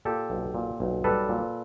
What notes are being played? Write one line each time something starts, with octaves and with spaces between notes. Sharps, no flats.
A#2 G4 A4
B1
A#2
B1
G3 A4 B4
A#2